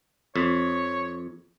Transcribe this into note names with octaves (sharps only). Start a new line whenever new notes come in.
F2 C#5